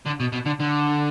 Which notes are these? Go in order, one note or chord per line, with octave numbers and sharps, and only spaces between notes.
D3
B2
B2
D3
D3